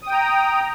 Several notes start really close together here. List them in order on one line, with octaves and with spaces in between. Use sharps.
D#6 G5 A#5